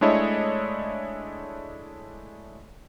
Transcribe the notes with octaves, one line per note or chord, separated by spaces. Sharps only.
G#3 A3 D4 E4 C#5 D#5